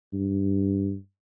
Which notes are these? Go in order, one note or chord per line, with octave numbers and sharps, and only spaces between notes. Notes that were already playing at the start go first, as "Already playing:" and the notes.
G2